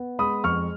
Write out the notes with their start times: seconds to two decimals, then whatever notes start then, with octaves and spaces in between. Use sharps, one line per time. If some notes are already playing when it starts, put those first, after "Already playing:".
Already playing: B3
0.19 G#3 B5 D#6
0.44 F2 C#6 F6